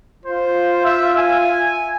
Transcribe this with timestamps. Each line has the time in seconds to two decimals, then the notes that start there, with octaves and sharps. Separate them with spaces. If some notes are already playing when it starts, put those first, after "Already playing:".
0.25 F4 C5
0.83 E5
1.18 E5 G#5